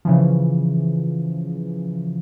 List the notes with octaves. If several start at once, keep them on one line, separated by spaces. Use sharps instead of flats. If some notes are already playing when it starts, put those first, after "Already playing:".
C#3 E3 F3